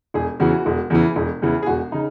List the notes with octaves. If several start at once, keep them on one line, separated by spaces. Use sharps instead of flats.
E1 G#4
E2 C#3 E3 F#4
E1
E2 C#3 E3
E1
E2 C#3 E3
G#4
E1 F#4
C#3 D#4